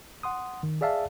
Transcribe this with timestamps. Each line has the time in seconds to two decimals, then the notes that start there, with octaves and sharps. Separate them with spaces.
0.23 F#5 C6 D#6
0.63 D#3
0.81 G#4 D5 E5 F5 A5